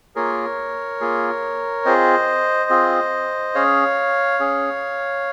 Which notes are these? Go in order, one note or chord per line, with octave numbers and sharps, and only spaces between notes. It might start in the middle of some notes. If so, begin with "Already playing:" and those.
A#3 F4 G#4 A#4 C#5
A#3 F4 G#4
C4 F4 G#4 C5 D#5
C4 F4 G#4
C#4 G#4 C#5 F5
C#4 G#4